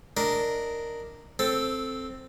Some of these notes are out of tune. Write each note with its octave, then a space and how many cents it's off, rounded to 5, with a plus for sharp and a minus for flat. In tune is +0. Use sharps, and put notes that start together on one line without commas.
D4 +0 A#4 -5 D#5 +10
C4 +0 A4 +0